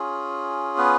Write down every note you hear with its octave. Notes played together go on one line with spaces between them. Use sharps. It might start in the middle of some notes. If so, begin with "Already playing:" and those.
Already playing: C#4 F4 G#4
B3 B4